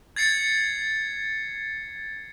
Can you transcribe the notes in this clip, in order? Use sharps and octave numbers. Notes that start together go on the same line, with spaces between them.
G#6 A6 C7 C#7